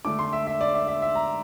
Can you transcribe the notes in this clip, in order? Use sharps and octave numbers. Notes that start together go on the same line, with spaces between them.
D3 A3 D4 D6
C6
E5
E5
D5
E5
E5
E5
A#5